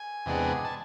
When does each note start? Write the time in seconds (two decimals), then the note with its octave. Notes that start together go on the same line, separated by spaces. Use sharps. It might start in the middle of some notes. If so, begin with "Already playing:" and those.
Already playing: G#5
0.26 E2 C3 G#3 B3 D4
0.65 A5